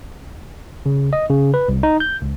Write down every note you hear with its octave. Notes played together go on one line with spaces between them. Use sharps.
C#3
D#5
C#3
B4
C2
D#4
G6
C#2